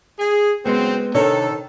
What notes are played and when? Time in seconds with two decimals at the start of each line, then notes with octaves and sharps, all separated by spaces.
0.19 G#4
0.65 C#3 F#3 G#3 B3 C4
1.14 C3 D#3 D4 A4 C#5